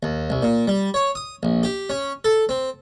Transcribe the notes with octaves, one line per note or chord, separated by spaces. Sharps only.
D#2
C2
A#2
G3
C#5
D#6
A#1
G4
C#4
A4
C4